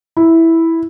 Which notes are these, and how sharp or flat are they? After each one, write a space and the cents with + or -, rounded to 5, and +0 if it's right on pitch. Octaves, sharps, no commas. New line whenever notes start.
E4 -5